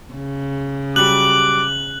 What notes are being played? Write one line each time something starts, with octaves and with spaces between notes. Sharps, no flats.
C#3
F#3 G3 D6 F#6 F#7